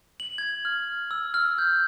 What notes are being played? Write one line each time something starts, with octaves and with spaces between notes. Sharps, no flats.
F#7
G#6
F6
E6
F6
G6